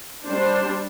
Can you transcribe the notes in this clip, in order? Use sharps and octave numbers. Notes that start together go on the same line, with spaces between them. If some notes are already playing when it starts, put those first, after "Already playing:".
G3 D4 C5